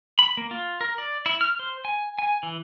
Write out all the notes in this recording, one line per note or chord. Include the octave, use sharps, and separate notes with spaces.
B5
A#3
F4
A#4
D5
E4
F6
C5
G#5
G#5
E3